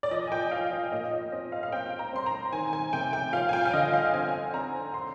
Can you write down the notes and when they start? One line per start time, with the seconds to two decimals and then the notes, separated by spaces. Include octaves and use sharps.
0.03 D5
0.11 F3 D#5
0.27 G#5
0.32 G5
0.51 F3 F5
0.72 D#5
0.92 A#2 D#5
1.11 D#5
1.32 C4 D#5
1.52 F5
1.63 F5
1.72 C4 G5
1.99 A#5
2.13 C4 C6
2.26 A#5
2.52 D#3 G#5
2.73 G#5
2.93 C3 G5
3.13 G5
3.33 F3 F5
3.49 G#5
3.53 G5
3.65 F5
3.73 D3 D#5
3.93 F5
4.14 C4 G#5
4.54 C4 A#5
4.94 C6